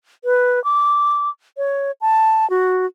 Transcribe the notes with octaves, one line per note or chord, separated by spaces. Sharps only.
B4
D6
C#5
A5
F#4